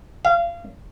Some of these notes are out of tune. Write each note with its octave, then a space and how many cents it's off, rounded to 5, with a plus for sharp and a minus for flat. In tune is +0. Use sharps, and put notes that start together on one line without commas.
F5 -30